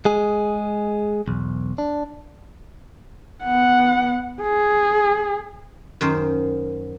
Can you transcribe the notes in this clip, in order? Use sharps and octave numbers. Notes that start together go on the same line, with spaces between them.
G#3 G#4
B1 E2
D4
B3 F#5
G#4
F#2 D#3 C5